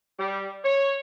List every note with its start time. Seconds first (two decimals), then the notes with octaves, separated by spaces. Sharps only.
0.18 G3
0.64 C#5